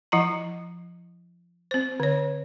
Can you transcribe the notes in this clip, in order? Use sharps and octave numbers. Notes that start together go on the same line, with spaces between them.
F3 E4 F#5 A#5
C4 C5
D3 C#5